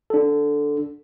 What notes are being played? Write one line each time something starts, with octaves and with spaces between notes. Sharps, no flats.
D4 A4